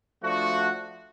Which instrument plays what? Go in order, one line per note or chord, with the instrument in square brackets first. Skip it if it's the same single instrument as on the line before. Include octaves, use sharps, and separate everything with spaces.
[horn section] F3 A3 D4 F#4